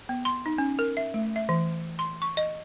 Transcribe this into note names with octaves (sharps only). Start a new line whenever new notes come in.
B3
C6
D#4
C#4
A#4
E5
A3
E5
E3
C6
C#6
D#5